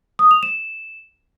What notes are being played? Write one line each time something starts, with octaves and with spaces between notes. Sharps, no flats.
D#6
F7
E7